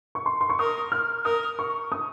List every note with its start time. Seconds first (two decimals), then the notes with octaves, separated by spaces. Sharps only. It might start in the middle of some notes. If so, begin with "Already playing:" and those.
0.15 C#6
0.26 C6
0.41 C6
0.50 C#6
0.59 A#4 D#6
0.92 F6
1.25 A#4 D#6
1.59 C#6
1.92 D#6